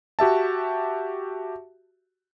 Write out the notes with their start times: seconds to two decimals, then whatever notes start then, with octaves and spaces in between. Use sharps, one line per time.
0.19 F#4 G4 E5 A5